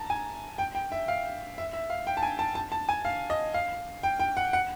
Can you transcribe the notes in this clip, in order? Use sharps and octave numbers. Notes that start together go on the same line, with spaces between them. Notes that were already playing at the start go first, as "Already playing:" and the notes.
Already playing: A5 A#5
G#5
G5
G5
E5
F5
E5
E5
F5
G5
A5
G#5
A5
A5
A5
G#5
F5
D#5
F5
G5
G5
F#5
F#5